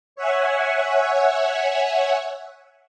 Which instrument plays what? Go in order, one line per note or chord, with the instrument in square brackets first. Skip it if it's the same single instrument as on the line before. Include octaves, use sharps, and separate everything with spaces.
[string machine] C#5 E5 F#5 G#5